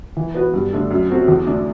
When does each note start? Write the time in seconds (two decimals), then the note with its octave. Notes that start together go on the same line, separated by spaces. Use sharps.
0.17 E3
0.35 B3 F#4 B4
0.54 G2
0.72 D3 A3 D4 A4
0.91 F#2
1.09 F#3 C4 F#4 A4
1.28 E2
1.46 D3 A3 D4